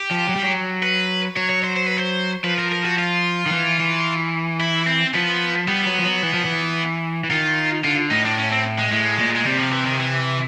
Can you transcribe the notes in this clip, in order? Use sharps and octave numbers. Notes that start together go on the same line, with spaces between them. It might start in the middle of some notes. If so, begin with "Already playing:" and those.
Already playing: G4
F3
F#3
G3
F#3
B4
F#3 C#5
C#5
C5
C5
B4
C5
F3 B4
A#4
A#4
F#4
F4
D#3
E3
E3
E4
C4
F3 B3
G3 B3
F#3
F3
F#3
E3
F3
E3
E3
D#3 F4
D3 F4
A2 D#4
D4
C#4
C4
G#3
A2 G#3
A#2
G#3
C3 G3
F3
E3
D#3
E3